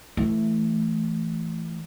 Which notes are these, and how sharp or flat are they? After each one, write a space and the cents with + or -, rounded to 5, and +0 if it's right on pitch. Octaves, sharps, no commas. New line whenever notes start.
E3 +10 A3 +0